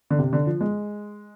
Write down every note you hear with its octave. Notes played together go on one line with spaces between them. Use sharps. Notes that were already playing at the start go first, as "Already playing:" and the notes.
D3
C3
D3
F3
G#3